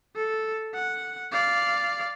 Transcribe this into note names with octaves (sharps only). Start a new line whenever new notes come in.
A4
F#5
D5 F5